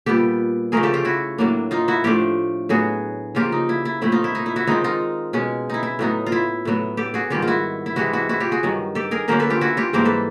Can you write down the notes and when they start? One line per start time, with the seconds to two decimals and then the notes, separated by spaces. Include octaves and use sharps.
0.06 A#2 G3 B3 G4 A4
0.72 C#3 F3 A3 G#4 A#4
0.83 G4 A4
0.94 F4 G4
1.05 E4 F#4
1.38 A2 F#3 A#3 D4
1.71 D#4 F4
1.88 E4 F#4
2.04 A2 F3 A3 D4 F4 G4
2.69 A2 F#3 B3 F#4 G#4
3.35 C#3 F3 A#3 F4 G4
3.52 D#4
3.69 E4
3.85 E4
4.01 A#2 F3 A3 C4 E4
4.12 D#4 F4
4.24 E4
4.35 D#4
4.46 E4
4.56 E4 F#4
4.67 D#3 G#3 C4 D#4 F4
4.84 D#4 F4
5.33 B2 G#3 C#4
5.70 D#4 E4
5.83 E4
5.99 A2 F#3 B3 D#4
6.26 F4
6.32 E4
6.65 A2 F#3 B3
6.97 G4 A4
7.14 F#4 G#4
7.30 G#2 D#3 G3 F4 G4
7.42 F4
7.47 E4 F#4
7.86 E4
7.96 C3 E3 G#3 E4 F#4
8.13 E4 F#4
8.29 E4 F#4
8.40 F4 G4
8.52 F#4 G#4
8.63 G2 D#3 F#3
8.95 G4 A4
9.11 G#4 A#4
9.28 D3 F#3 A#3 C#4 A#4 C5
9.40 A4 B4
9.50 F4 G4
9.61 E4 F#4
9.77 F4 G4
9.93 G#2 E3 G3 A#3 A#4 C5
10.05 A4 B4